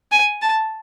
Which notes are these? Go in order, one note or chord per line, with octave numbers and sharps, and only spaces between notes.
G#5
A5